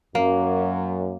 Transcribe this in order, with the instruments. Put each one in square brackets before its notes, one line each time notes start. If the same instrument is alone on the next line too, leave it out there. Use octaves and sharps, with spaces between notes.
[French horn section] F#2 [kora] A#3